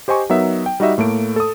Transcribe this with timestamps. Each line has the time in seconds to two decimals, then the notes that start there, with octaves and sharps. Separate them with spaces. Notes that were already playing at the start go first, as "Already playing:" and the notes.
0.08 G4 C5 D#5 G#5 C#6
0.30 F#3 B3 D#4 A#4 E5
0.66 G5
0.80 G3 D#4 F#4 D#5 E5
0.98 A2 A3 A#3 D7
1.36 A4 D#6